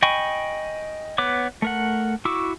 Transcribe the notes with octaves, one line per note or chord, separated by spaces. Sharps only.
D#5 G5 G#5 B5 C#6
B3 B4 C#5 D6
A3 A#4 F#5
E4 F#4 C#6 D6 E6